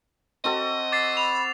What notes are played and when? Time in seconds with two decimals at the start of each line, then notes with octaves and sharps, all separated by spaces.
0.44 C4 F#4 A4 D#5
0.92 D6 A6 C7
1.17 B5 F7